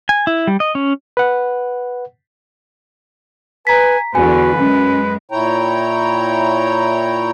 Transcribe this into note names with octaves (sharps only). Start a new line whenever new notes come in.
G#5
E4
G3
D#5
C#4
B4 F#5
B4 G#5 A#5 B6
E2 D3 F#4 B4 G#5
F#2 G#3 C#4
A#2 E4 C#5 G5 A#5